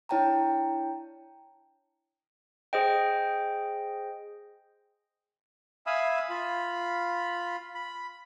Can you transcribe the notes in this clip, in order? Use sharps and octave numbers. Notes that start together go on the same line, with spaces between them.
D4 E4 C#5 G5 A5 A#5
G#4 C5 D#5 G5
E5 F5 G#5 B5 D#6 E6
F4 B5
B5